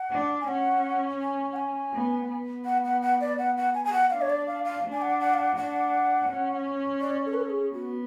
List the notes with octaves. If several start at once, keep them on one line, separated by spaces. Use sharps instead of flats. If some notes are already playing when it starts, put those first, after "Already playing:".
Already playing: F#5
D4
G#5
C#4 F#5
G#5
F#5
G#5
B3
B3
F#5
F#5
F#5
D5
F#5
F#5
G#5
G#5
F#5
D4 F5
C#5
D5
F5
F5
D4
G#5
F#5
F#5
F5
F#5
D4 F#5
C#4
D5
A4
B4
A4
G#4
B3 F#4